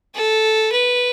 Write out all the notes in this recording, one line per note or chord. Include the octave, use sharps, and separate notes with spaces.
A4
B4